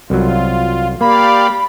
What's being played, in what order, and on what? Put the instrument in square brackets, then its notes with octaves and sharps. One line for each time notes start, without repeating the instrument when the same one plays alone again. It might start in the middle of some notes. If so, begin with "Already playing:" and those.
[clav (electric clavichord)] C2 F#3 [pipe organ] F4
[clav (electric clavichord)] A#3 [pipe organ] G4 D5 F5 [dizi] B5